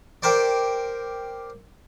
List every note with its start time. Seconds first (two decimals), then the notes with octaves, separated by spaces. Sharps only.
0.23 G4 A#4 C5 D5